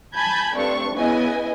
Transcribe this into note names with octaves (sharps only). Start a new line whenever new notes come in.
G#5 A5 B5 G6 G#6
G2 A3 C4 D4 C#6
C#3 B3 E4 B4 D#5 G#5